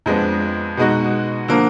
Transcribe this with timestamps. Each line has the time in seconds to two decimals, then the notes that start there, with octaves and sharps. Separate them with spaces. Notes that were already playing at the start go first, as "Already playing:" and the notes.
0.06 F2 F3 G#3 B3 D4
0.77 B2 G#3 D#4 F#4
1.48 D3 F3 A#3